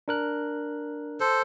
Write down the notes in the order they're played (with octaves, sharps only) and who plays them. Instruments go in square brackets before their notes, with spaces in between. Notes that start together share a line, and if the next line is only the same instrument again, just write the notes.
[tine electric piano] D4 A#4 F#6
[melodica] A4 C5